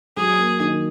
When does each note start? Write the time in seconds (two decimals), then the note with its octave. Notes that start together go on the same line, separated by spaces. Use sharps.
0.16 F#3 G#4
0.38 A#3
0.60 D#3